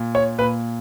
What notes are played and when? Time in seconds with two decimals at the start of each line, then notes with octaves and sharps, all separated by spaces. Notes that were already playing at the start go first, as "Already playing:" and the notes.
Already playing: A#2
0.15 C#5
0.38 A#2 B4